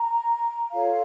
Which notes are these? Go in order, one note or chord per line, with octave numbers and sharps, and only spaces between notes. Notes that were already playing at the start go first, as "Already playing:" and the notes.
Already playing: A#5
F4 A4 C#5 F5